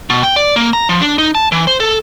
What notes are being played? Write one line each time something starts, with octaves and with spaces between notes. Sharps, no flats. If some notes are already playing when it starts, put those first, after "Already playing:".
B2
G5
D5
A#3
A#5
F3
D4
D#4
A5
E3
C5
A4